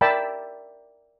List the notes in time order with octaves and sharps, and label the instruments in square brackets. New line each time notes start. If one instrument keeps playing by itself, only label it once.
[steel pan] A#4 D5 E5 G5 A5 B5